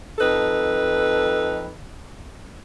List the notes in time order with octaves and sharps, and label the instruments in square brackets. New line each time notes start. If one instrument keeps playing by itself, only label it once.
[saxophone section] F2 D#4 A4 B4